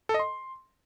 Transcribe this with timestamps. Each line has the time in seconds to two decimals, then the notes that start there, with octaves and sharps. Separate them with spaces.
0.09 A4
0.14 D#5
0.19 C6